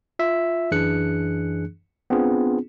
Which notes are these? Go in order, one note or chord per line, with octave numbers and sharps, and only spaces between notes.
F4 E5
F#2 E3 D4 G#4 F#6 C#7
B3 C4 D4 F4 G#4